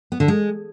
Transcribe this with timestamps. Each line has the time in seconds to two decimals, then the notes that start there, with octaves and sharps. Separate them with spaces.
0.12 B3
0.20 D3
0.28 G#3